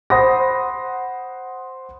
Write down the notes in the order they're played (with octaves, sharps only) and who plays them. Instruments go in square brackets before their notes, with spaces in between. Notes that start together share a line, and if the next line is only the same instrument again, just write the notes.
[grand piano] C5 F#5 B5 C6 D#6 A#6